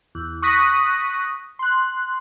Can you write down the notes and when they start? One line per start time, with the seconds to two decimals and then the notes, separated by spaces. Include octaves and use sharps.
0.15 E2
0.42 C#6 D#6 F#6 A#6 B6 D#7
1.59 C6 F#6